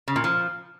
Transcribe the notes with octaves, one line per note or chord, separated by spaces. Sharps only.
C#3
A#2
F3